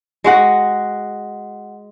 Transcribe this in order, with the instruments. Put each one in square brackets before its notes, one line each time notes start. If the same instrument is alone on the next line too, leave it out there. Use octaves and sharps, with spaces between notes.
[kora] G#3 F#4 F#5